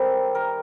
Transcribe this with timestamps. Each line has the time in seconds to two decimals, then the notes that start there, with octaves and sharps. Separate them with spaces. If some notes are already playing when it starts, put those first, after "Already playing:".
Already playing: D#3 G3 C4 A4
0.35 A#4